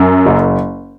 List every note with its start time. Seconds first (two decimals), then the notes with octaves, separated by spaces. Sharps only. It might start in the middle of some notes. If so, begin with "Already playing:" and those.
Already playing: F#2
0.26 F#1